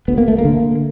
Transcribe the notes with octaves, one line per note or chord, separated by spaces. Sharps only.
D2 B3
A#3
A3
A#3
D3